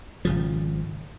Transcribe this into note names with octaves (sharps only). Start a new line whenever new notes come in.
G#1 C#3 F3